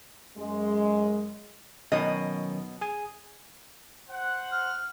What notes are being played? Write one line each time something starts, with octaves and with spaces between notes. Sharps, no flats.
F#2 G#3
B2 D#3 F#3 C#4 D#5
G#4 G#5
C5 F#5
F6